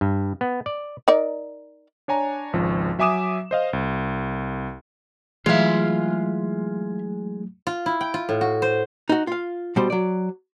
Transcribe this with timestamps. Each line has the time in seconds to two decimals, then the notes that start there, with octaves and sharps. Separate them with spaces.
0.01 G2
0.41 B3
0.66 D5
1.08 D#4 A#4 D5
2.08 D4 C#5 G#5 A#5
2.53 G#1 C#2 F3
2.99 F#3 E5 G#5 D6 D#6 E7
3.51 C5 D#5 F5
3.73 C2
5.46 E3 F#3 G#3 A3 F4 E5 F5
7.67 F4
7.86 E4
8.01 G5
8.14 F4
8.29 A2
8.41 F#4
8.62 C5
9.09 D#4 F#4
9.27 F4 F5
9.76 B2 G3 C5
9.90 F#3 D5